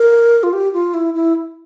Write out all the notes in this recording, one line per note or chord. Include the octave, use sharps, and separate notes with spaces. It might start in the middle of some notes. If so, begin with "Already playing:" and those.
Already playing: A#4
F4
G4
F4
E4
E4